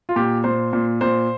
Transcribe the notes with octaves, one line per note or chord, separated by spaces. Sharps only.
F4
A#2 G4
A#2 C5
A#2
A#2 C5